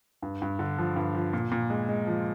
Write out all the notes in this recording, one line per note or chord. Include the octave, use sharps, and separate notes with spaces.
G2
G2
D3
F3
G2
F3
A#2
A#2
G#3
G#3
F3